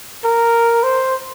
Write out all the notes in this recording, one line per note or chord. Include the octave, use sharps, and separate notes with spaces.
A#4
C5